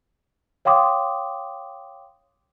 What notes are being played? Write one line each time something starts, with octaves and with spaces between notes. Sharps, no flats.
C#5 F5 G5 C6 D6 D#6